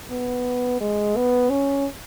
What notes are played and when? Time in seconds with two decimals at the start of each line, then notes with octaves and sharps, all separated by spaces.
0.11 B3
0.81 G#3
1.16 B3
1.50 C#4